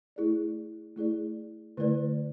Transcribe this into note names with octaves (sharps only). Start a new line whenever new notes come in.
A3 E4 G#4 D5
A3 E4 G#4 D5
D3 A3 E4 B4 D5